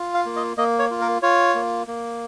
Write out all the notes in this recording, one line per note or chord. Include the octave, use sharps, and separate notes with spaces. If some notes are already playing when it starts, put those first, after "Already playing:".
Already playing: F4
F5
A#3
D#5
A#3 D#5
C#5
F4
A#4
F4 C#5
A#3
A#3